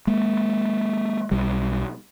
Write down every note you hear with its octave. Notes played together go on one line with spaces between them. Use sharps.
G#3 A#3
B1 G3